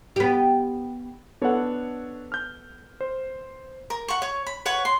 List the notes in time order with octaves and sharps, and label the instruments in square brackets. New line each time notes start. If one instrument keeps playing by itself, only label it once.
[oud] B3 G4
[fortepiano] B3 A4 F#5 [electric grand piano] D4 C#5
[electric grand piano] F6 G6
C5
[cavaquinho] A#4
F#5 C#6
C#5
B5
B4 C#5 F#5
C6